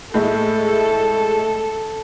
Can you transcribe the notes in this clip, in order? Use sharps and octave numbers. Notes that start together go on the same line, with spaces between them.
A2 G#3 E4 A4